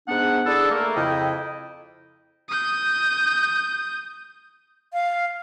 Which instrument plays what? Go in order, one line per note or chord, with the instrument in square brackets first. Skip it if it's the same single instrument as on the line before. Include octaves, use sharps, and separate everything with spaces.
[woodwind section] G#2 B3 D4 F#5
D4 E4 G#4 A4
A3 A#3
F2 C#3 E4 D#5 G5
[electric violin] D#6 G6
[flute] F5